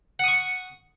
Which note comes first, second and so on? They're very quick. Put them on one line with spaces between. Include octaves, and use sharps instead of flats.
F#5 D#6 C#6